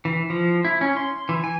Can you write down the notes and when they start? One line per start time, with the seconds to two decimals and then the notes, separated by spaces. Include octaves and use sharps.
0.05 E3
0.30 F3
0.65 E4
0.81 C#4
0.97 C6
1.29 E3
1.44 G#5